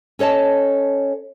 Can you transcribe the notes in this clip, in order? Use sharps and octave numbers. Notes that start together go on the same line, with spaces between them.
C#4 A4 C#5 D#5 A5